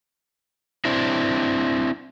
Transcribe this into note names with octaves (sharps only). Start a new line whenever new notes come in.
C4 D4 E4